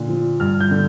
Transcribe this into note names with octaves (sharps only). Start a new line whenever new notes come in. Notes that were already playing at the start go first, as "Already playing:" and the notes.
Already playing: A#2 D3
F3
G2 F6
G6
D3